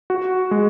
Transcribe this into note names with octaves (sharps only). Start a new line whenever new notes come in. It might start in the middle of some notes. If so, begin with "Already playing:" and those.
F#4
G#3